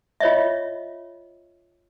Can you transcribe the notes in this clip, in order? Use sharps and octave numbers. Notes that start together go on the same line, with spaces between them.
F4 C#5 D#5 E5